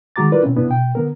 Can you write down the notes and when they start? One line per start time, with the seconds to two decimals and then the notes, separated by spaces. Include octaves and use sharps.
0.16 D#3 G#3 F#4 A#5 D6 A6
0.32 G3 E4 F4 A#4 B4 D5
0.43 B2 C4 C#4
0.56 G2 C3 B3 D4 E4
0.68 B2 G5
0.95 D3 B3 A#4